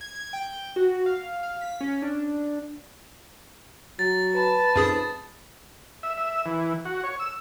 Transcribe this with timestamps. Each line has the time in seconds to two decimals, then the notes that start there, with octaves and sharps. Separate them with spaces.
0.01 G#6
0.33 G5
0.76 F#4
1.06 F5
1.43 F5
1.61 B6
1.81 C#4
2.02 D4
3.99 F#3 A6
4.32 B4 A5
4.76 F1 F#2 G#4 D#6
6.03 E5
6.17 E5
6.46 E3
6.85 F#4
7.03 C#5
7.20 E6